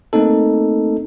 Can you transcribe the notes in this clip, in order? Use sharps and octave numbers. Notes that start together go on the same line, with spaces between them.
A3 A#3 C4 D#4 A4